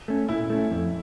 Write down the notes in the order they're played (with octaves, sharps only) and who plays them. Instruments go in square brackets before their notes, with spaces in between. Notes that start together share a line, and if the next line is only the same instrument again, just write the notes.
[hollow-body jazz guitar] A3 C#4
[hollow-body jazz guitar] A#2 [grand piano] E4
[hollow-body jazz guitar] A3 C#4
F2